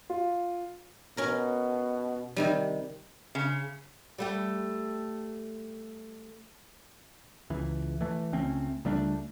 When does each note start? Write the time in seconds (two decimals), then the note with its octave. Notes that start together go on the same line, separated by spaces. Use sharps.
0.10 F4
1.17 B2 C#4 A#4
2.36 C3 D#3 G3
3.35 C#3
4.18 G3 A3 G4
7.50 C#2 E3
8.01 E3 A3
8.33 C#2 A3 C4 C#4
8.85 C#2 G3 A3 D4